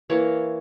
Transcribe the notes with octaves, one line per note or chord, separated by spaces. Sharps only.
E3 A#3 C#5